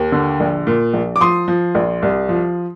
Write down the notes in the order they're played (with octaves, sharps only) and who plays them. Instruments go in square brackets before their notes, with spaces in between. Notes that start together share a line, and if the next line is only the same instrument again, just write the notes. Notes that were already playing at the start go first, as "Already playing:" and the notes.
Already playing: [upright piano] D#2
D3
A#1
A#2
A#1
D6
F3 C6 D#6
F3
A#1
C2
F3